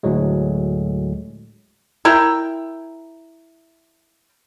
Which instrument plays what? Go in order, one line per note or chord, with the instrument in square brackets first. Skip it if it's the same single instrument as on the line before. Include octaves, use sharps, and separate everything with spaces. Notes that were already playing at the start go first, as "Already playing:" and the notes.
[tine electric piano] D2 A2 F#3 G#3
[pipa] E4 A#4 G5